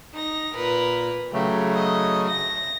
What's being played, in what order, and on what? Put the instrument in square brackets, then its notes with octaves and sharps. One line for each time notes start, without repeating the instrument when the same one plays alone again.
[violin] D#4 A#6
[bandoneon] A#2 [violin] A#4 B4
[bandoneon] C#3 F#3 A3 [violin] G4
[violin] D#5
A#6